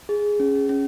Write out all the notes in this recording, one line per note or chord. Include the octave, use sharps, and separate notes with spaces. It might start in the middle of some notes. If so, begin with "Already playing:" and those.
G#4
C#4
C#4